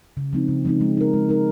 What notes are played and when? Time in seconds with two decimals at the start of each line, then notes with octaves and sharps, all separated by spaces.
0.17 C#3
0.33 F3 G#3 C4 D#4
0.48 C#3
0.65 F3 G#3 C4 D#4
0.81 G#3
0.97 D#4 A#4
1.13 G#3
1.29 D#4 A#4